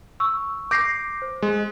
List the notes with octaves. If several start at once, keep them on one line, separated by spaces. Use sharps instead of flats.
C#6 E6
D6 G6 A#6 C7
C5
G#3